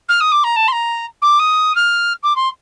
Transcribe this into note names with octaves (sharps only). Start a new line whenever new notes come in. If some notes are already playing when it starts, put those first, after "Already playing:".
F6
D#6
D6
A#5
A5
C6
A#5
D6
D#6
F6
D6
C6